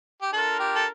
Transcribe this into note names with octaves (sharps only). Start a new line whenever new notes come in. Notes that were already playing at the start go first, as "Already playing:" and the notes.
G4
D4 F4 A4 A#4
G4
A4